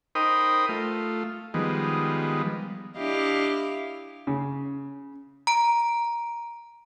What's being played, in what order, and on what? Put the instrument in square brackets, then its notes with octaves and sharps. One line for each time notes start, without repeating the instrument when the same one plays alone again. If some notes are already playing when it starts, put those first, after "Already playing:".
[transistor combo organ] D#4 A#4 C5 G5 B5 D#6
A3 F4
D#3 F3 G3 G#3 B3
[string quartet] D4 E4 G4 D#5 F5
[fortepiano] C#3
[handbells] A#5 D7